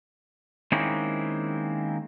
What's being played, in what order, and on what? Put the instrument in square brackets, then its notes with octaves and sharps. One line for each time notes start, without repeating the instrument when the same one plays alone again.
[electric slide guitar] D#3 G#3 A#3 C4 C#4 E4